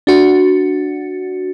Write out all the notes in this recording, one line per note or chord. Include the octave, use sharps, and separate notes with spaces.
D4 F#4